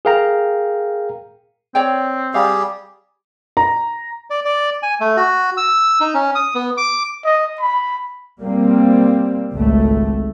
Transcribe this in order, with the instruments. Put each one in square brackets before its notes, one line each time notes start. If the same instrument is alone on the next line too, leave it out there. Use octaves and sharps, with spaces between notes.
[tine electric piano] G#4 A#4 F5 G5 A#5
[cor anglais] C4 [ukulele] C#5 D5 G5
[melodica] G3 G4 G#4 [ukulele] F5
[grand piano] A#5
[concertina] D5
D5
G#5
A3
F#4
E6
D#4
C#4
D#6
B3
D6
[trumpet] D#5
B5
[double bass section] G3 A#3 C4
G#1 C#2 A3